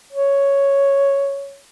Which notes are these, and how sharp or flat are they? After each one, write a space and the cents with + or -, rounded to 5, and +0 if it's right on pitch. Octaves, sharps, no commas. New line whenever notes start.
C#5 +0